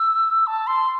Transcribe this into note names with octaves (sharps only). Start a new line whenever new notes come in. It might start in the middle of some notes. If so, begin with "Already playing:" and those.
Already playing: E6
A5
C6